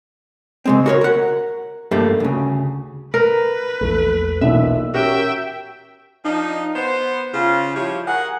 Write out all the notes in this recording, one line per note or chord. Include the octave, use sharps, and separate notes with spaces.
C#3 G#3 C4
F#4 A#4 C#5
A#4 F#5
G2 A3 A#3 G4
D2 C#3
A#4 B4
A#1 E2 A3
B1 A#2 E3 E5
C#4 F#4 G4 A#4 E5 G5
F3 D4 D#4
B3 C5
C#3 F4
F3 G3 E4 G4 C#5
G#4 A#4 F#5